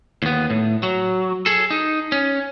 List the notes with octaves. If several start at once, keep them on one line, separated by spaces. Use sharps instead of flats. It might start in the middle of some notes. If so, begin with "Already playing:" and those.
D#2 B3
A2
F#3
G#4 A4
D#4
C#4